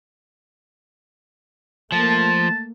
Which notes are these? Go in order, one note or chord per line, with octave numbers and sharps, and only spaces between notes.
F3 A3 A#3 A5